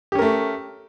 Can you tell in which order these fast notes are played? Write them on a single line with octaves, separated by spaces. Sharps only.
G4 C#4 A#4 A3